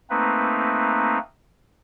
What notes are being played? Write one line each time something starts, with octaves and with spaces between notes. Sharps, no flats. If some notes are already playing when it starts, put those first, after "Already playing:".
A3 A#3 C4 D#4 B4